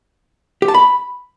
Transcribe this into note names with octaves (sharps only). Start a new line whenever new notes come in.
G4
A5
B5